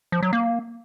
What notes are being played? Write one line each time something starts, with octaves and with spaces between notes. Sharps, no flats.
F3
F#3
A#3